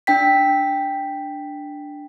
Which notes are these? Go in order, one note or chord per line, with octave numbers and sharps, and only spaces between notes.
D4 G5 B6